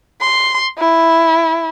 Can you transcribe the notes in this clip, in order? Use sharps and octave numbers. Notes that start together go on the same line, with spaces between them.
C6
E4